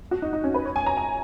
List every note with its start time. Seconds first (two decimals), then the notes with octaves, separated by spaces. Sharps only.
0.11 F#4
0.22 D#4
0.33 D#4
0.44 C#4
0.54 B4
0.65 C#5
0.76 G#5
0.86 A#5
0.97 G#5